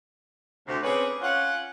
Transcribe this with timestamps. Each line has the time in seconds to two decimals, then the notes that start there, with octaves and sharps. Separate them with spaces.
0.67 D2 C3
0.83 C4 C#4 G#4 B4 C#5 D5
1.21 C#4 F4 F#5